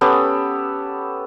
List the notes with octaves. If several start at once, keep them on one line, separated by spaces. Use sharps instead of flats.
B3 C#4 G4 A4